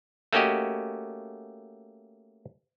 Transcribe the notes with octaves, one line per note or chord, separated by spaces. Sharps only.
A3 A#3 C#4 F#4 G4 D#5